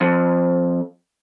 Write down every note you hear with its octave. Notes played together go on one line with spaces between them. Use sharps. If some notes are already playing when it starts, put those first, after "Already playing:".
F2